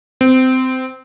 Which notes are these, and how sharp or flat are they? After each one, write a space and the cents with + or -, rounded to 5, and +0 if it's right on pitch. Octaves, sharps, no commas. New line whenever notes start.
C4 -20